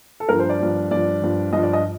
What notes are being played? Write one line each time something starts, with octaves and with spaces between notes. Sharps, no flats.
A4
G2 F3 A#4
C5
D5
G2 F3
G2 F3 D5
G2 F3
G2 F3 D#5
D5
D#5